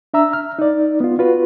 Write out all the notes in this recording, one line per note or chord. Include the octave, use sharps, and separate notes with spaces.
D4 E5 A#5 E6
F6
D#4 D5
B3 F4
F4 F#4 B4